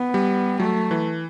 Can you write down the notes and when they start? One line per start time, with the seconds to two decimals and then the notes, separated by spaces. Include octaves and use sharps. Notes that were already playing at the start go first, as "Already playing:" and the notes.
Already playing: B3
0.14 G3
0.60 F#3 A3
0.91 E3